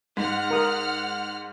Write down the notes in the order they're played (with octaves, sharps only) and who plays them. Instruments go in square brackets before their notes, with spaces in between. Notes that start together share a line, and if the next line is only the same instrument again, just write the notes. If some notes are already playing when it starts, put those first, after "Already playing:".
[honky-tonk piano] G#2 [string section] F#5 F6
[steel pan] A#4 D#6